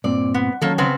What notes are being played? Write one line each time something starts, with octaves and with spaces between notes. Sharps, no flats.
G2 A#2 C4 D5
B3
D#3 F#3 A#3 C#4 A4
C#3 B3 C4